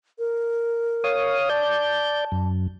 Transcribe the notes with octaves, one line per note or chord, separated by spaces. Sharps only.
A#4
C#5 F5 D#6
D5 A5 G6
F#2